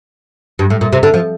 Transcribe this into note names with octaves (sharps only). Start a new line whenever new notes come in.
G2
A2
A#2
C3
D3
F3